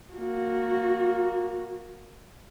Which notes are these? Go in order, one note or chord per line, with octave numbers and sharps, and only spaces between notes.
A#3 F#4